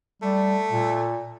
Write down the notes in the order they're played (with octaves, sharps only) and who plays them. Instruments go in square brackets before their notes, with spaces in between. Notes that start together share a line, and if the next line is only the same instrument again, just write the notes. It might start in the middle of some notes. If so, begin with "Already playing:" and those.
[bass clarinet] G3 [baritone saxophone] A3
[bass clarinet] A#2